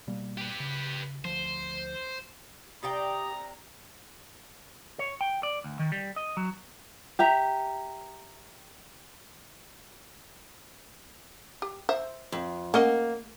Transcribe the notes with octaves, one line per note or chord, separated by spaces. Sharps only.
B2 G3 A#3
G4 B4
C#3
D2 F3 C5
C3 G4 D5 G5 A#5 D#6
C#5
G5
D5
D2
D#3
G3
D#5
F#3
G4 E5 A#5
G4
C5 E5
F2
A#3 C#4 D#5 F#5